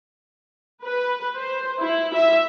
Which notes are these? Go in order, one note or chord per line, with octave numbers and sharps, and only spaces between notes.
B4
C5
E4
E5